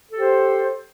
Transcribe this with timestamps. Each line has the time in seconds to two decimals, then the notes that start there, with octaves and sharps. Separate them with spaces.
0.12 A4
0.16 G4
0.20 C5